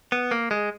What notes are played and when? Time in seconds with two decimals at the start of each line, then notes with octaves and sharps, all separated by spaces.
0.12 B3
0.31 A#3
0.51 G#3